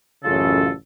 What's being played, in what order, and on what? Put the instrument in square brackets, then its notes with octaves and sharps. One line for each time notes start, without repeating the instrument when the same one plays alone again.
[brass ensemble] A1 F#2 C#3 [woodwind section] F4 A4